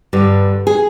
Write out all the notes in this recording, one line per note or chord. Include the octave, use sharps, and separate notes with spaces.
G2 D3 G3
G#4